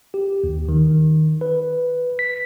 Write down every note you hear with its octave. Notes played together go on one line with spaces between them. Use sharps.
G4
D#2
D#3
B4
B6